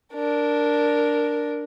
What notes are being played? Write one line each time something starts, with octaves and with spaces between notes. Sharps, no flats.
D4 A#4